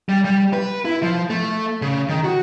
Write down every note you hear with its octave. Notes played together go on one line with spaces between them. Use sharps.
G3
G3
B4
E4
F3
A3
C#3
D#3
F#4